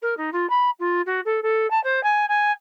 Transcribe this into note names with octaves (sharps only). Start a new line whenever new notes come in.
A#4
D#4
F4
B5
F4
F#4
A4
A4
A5
C5
G#5
G#5